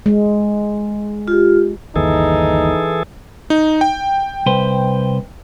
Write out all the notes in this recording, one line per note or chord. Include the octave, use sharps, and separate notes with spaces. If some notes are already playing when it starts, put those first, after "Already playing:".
G#3
F4 G4
G1 D#2 E3 D#4 G#4 A4
D#4
G5
C2 B4 C5